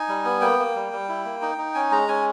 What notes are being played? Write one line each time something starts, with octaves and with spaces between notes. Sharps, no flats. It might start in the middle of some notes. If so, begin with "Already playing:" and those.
Already playing: D#4 G#5
G3
B3
A#3 G5
A#3
G3
G3
E4
A#3
D#4
D#4
C#4 G#5
G#3 A#5
C#4 G#5